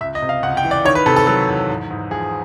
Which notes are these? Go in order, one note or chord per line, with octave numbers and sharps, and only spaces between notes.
C#2 E5
D#5
C3
F5
C#2 F#5
G5
E3
D5
D#3 C#5
B4
C3 A4
A4
F#3 A4
E2
G#2
G#2
F3 G#4